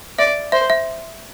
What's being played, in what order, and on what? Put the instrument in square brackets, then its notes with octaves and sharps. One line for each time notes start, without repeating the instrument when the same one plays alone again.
[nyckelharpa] D5 [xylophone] E5
[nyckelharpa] C5 [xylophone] E5
[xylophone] E5